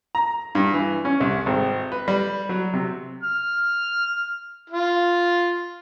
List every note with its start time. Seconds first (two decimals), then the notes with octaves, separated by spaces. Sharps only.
0.15 A#5
0.55 G2
0.74 E3
1.05 C#4
1.20 C2
1.46 G#1
1.92 B4
2.08 G3
2.49 F#3
2.73 C3
3.23 F6
4.70 F4